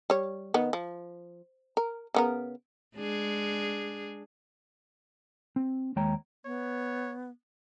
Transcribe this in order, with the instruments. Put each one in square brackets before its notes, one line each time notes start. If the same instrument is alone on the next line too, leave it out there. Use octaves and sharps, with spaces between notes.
[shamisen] G3 C#5
D#3 B3
F3
A#4
C#3 B3 A#4
[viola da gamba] G#3 D4 G#4
[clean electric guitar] C4
D#2 G#3 C#5 G5 A#5
[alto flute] B3 [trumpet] C#5